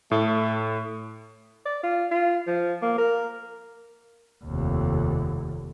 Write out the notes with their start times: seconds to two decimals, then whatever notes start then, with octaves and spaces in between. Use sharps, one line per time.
0.11 A2 A3
1.66 D5
1.83 F4
2.11 F4
2.47 F3
2.82 A#3
2.98 A#4
4.45 F1 D#2